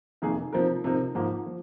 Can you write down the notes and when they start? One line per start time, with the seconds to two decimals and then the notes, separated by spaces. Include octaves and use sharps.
0.22 F1 F2 D#3 A#3 G#4
0.53 C3 F3 C4 D#4 A#4
0.84 C3 F3 C4 D#4 A#4
1.15 G#2 F3 A#3
1.46 F3